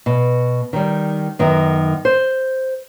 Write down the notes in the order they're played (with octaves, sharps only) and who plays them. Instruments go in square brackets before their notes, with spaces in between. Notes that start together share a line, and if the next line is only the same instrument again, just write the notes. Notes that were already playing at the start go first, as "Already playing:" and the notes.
[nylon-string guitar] B2
D#3 G3
F#2 D#3 B3
C5